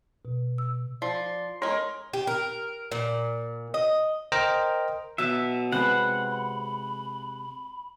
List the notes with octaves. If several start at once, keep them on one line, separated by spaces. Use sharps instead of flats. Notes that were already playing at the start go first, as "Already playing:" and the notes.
B2
E6
F3 D5 C6
G#3 C#4 A#4 C#5 C6
G4
A#4
A#2
D#5
A#4 C5 D#5 G5 A#5
B2 F#3 E5 A5
C3 G#3 B4 C5 F#5 B5